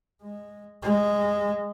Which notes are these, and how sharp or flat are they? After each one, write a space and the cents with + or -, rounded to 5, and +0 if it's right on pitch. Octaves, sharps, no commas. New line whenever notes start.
G#3 -10
G#3 -15